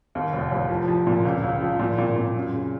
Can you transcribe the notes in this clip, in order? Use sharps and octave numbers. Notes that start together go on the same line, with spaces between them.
D#2
F1
F1
F3
F3
A#2
C#2
C#2
F3
A#2
A#2
A#2
F#2
C#3